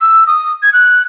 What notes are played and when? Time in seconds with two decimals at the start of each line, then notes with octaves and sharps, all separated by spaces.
0.01 E6
0.27 D#6
0.62 G#6
0.73 F#6